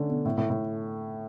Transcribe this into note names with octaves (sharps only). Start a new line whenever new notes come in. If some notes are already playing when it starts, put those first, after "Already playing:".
Already playing: D3 A3 C#4 D4
B2
A2
A2
A2